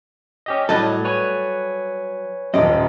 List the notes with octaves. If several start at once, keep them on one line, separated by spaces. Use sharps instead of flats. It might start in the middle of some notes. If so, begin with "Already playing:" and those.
C#4 G4 D#5
A2 F#3 G3 A4 D#5
B4 C#5 G#5
D#1 F#2 G4 D#5